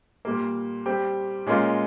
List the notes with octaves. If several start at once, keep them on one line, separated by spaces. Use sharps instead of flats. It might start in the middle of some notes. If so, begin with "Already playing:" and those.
A#2 G3 A#3
G3 C4 G4
A#2 G#3 C#4 F4 A#4